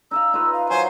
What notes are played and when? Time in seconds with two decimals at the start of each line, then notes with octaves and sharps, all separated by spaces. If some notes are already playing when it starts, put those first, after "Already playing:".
0.11 D#4 E5 F5 E6
0.33 D#4 F4 B4
0.53 F5
0.70 F#3 C5 F5 G#5